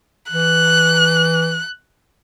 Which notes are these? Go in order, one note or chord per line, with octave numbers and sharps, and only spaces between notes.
E3 F#6